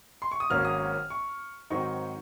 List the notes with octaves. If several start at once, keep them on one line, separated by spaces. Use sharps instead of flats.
C6
C#6
D#6
G#1 G#2 F#3 A#3 C#4 F6
D#6
C#6
G#2 D#3 F#3 C4 D#4 C#6